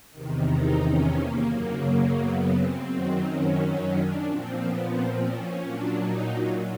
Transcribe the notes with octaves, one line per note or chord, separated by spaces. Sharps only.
E2 C3 D#3
D#4
C#4
A#3
F#2 C#3 F#3 A#3
A#3
B3
C4
F#2 D#3 F#3
C#4
C#4
D4
A#2 F3 C4
B3
C4
C#4
A#2 F#3 D4
D#4